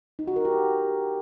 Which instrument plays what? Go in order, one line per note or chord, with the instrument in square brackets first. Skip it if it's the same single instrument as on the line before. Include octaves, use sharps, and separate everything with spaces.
[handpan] D#4
F#4
A#4
G4